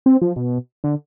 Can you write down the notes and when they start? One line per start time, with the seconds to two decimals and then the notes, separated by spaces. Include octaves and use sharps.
0.06 C4
0.22 F3
0.36 B2
0.84 D3